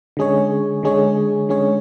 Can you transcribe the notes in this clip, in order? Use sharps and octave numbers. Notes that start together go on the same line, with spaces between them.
D3 G#3 C#4 G#4 C#5
D3 G#3 C#4 G#4 C#5
D3 G#3 C#4 G#4 C#5